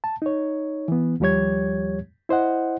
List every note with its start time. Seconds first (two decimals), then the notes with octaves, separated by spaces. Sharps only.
0.04 A5
0.22 D#4 C#5
0.88 E3 B3
1.20 D#2 F3 G3 G4 C#5 G#6
2.29 E4 C5 D#5 F#5